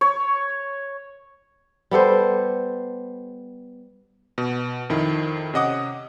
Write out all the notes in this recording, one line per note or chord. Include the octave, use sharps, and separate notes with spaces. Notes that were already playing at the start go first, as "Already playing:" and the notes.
C#5
G3 B3 A4 C5
B2
F2 D#3 E4
C3 C#4 D#5 F#5 D6 D#6